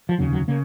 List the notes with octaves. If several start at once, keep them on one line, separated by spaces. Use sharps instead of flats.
F3
F1 D#2 C#3 F#3
F#3
C#3 A#3